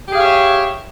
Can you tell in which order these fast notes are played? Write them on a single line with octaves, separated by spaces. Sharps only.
G4 G#4 F5 C#5 E5